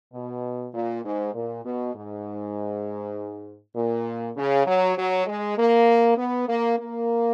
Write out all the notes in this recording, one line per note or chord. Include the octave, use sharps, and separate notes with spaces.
B2
A#2
G#2
A#2
B2
G#2
A#2
C#3
F#3
F#3
G#3
A#3
B3
A#3
A#3